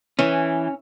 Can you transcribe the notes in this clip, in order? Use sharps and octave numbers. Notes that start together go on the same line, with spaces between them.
E3 C#4